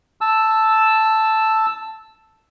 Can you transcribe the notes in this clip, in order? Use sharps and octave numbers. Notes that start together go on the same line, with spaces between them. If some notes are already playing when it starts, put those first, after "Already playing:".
A5 E6